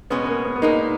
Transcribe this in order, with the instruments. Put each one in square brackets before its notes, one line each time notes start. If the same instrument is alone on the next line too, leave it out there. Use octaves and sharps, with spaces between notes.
[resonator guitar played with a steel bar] B2 G#3 C#4 [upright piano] B3
[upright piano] B3
A#3
B3
B3
[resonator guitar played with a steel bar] A#2 G#3 D#4 [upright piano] A#3